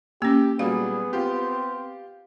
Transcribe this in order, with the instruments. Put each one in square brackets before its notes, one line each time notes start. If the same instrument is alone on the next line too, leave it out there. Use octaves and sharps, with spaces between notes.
[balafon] A#3 C#4 [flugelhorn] G4 [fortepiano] E6
[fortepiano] A#2 F#3 G3 [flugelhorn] B3 [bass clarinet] G#4 [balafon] F5
[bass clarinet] C4 [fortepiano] F4 G4